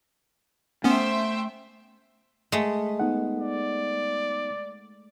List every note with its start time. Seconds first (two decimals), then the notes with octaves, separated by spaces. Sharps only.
0.84 A3 B3 C#4 C5 E5 G5
2.52 G#3 A3
2.99 B3 D#4 F#5
3.40 D5